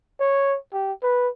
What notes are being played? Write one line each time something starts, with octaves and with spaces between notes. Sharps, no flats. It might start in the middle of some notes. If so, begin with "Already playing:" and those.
C#5
G4
B4